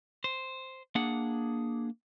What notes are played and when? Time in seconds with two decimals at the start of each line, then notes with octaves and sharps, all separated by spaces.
0.24 C5
0.95 A#3 D4 G#4 F#5